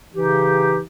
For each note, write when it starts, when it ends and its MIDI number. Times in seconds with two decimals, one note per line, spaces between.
0.15 0.79 49
0.15 0.79 52
0.15 0.79 63
0.15 0.79 67